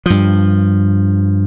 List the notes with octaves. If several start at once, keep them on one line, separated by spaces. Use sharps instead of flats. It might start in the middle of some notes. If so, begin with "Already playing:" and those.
G2 F3